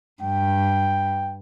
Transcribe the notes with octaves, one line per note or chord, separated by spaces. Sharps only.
G2 G5